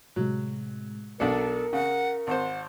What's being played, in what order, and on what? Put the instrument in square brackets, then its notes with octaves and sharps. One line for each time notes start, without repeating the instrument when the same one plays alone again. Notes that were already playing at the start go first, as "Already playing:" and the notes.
[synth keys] A2 C3 G#3 [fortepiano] F#3
[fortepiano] B1 D4 [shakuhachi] A4 [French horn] A#4 [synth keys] C#7
[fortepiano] C#3 [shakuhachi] F#5
[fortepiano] G#1 C5 [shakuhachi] F#5